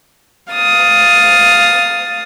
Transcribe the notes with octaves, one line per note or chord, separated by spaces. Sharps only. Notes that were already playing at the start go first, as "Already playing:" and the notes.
F5 D#6 A6